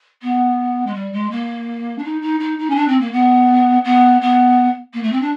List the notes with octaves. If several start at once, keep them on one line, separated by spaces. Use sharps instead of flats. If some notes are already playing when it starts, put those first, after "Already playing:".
B3
G#3
G3
G#3
A#3
D4
D#4
D#4
D#4
D#4
C#4
D4
C4
A#3
B3
B3
B3
A#3
A3
C4
D4